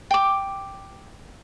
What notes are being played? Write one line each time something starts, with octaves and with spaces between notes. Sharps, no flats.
G5 D6